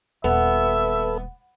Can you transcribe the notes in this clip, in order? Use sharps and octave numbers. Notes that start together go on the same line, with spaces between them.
D#1 B3 A4 B4 E5